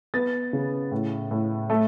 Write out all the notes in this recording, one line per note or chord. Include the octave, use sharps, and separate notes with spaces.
B3 A6
C#3
A2
A2
A3